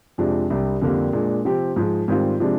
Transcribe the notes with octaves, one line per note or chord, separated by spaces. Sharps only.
F2 C3 F3 G#3 D4
C2 C3 G3 D4
F2 D3 G3 A#3
A#2 G#3 D4
C3 F3 C4 G4
G#2 F3 G#3
G#2 D#3 G3 C4 F4
C3 F3 G#3 D4